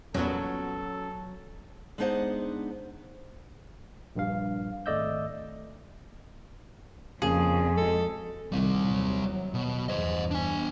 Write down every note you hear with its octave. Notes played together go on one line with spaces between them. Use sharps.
E2 A#2 F#3 B3 C#4 F#4 A4
G#3 B3 D4 D#4 C5 F#5
A#1 G2 F5
G#1 A3 D5 D#5 E6 G6
F2 C#3 F3 A#3 G#4
G#3 F#4 A4
C2 D#3 G3 C4
D#2 F#3
B2
E2 G2 C5 D#5
D4 G#5